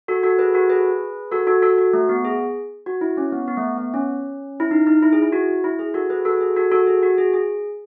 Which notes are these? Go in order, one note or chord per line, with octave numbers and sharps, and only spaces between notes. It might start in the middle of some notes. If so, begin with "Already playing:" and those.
F#4 A4
F#4 A4
G#4 B4
F#4 A4
G#4 B4
F#4 A4
F#4 A4
F#4 A4
F#4
A3
B3
G#4
F#4
E4
C#4
B3
B3
A3
B3
B3
C#4
E4
D#4
D#4
E4
G#4
E4
F#4
E4
G#4
F#4 A4
G#4 B4
F#4 A4
G#4
F#4 A4
F#4 A4
G#4
F#4
G#4
G#4